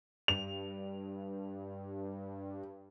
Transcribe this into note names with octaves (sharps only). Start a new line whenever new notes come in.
G2 F7